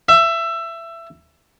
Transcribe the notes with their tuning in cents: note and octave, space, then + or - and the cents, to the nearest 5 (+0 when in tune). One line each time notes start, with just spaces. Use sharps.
E5 +20